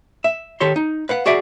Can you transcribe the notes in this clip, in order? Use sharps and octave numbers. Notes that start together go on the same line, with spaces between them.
E5
D#3 G4 A4 C#5 C6
D#4
B4 F5 F#5
F#4 G#4 D5 E5 F#5